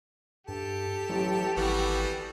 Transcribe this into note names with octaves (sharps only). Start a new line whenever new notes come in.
G2 G4 A4 A5
A1 F#3
G#1 E3 G3 B3 F#4